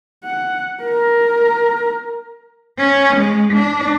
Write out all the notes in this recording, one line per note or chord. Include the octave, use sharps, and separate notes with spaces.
F#5
A#4
C#4
G#3
D4